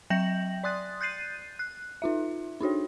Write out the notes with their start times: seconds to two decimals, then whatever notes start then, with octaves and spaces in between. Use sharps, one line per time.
0.10 F#3 E5 G5 G6 A#6 F#7
0.64 D5 C6 D#6 F#6 A6
1.01 F#6 G6 A6 C7 D#7
1.59 F#6
2.02 D#4 F4 E5
2.61 D4 D#4 F#4 C#5